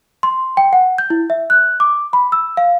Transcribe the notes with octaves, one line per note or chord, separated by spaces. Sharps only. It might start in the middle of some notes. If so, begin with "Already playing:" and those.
C6
G5
F#5
G6
E4
E5
F#6
D6
B5
E6
F5